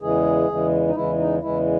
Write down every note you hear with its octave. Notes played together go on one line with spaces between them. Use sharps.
E2 C#3 E3 G#3 G#4
E2 C#3 E3 G#3
D#4
E2 C#3 E3 G#3 E4
D#4
E2 C#3 E3 G#3 E4